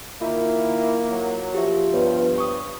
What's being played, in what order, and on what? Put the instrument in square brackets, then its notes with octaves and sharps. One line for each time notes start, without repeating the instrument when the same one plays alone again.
[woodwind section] D#3 E4 [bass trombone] A#3 [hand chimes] F4
[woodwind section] F#3
[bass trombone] F3 [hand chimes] G4 E5
[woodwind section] G2 [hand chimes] B3 B4 C#5
[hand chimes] C#6 D#6